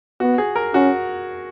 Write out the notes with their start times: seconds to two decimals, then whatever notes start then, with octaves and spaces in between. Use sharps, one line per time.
0.20 B3 F#4
0.38 G#4
0.56 A#4
0.74 C#4 F#4